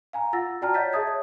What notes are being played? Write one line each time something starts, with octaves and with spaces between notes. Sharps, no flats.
F5 G#5 A#5
F4 F#5 E6 A6 A#6
F#4 D5 G5 A5 A#5 F6
C#5 D#5 F#5 G6 A6 B6
G#4 E5 A5 D#6 G#6
C#5